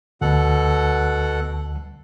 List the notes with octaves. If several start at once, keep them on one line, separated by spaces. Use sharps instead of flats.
D2 B2 A4 F#5